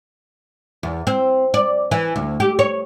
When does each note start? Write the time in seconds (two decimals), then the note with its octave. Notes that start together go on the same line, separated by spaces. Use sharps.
0.83 E2
1.07 C4
1.54 D5
1.91 E3
2.16 D2
2.40 G4
2.59 C#5